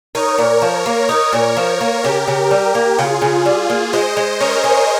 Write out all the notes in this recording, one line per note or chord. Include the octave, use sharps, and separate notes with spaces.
D#4 A#4 C#5
A#2
F3
A#3
D#4 A#4 C#5
A#2
F3
A#3
C#3 G4 A#4
C#3
G3
A#3
C#3 F4 G#4
C#3
G3
A#3
G#3 C5 D#5
G#3
C#4 A#4 C#5
G#4